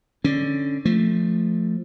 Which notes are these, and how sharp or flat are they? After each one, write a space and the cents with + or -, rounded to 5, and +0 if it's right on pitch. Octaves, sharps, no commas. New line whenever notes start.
D3 +0 C#4 +0
F3 +0 A3 +0